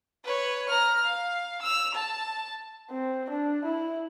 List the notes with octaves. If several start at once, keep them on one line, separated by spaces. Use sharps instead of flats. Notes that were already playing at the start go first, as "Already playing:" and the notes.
B4 C#5
A#5 F6
F5
E6 F7
A5
C4
D4
E4